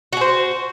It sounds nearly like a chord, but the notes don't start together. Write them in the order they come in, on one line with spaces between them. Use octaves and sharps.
F#4 G#4 C5